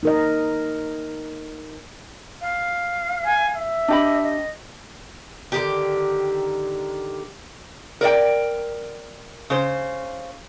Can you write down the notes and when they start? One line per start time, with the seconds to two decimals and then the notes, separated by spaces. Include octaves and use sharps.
0.03 D#4 A#4 D#5
2.41 F5
3.26 G#5
3.56 E5
3.88 D4 G4 D#5 B5
4.23 D#5
5.52 D3 D#3 G4
8.01 A#4 D5 D#5 G5
9.50 C#3 C5